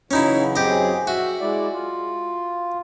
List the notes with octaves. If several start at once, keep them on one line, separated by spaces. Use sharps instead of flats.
C#3 E3 F#3 C#4 D#4 E4
F#2 C4 G4 G#4 D#5
F#4 E5 F#5
G#3 E4 D5
F4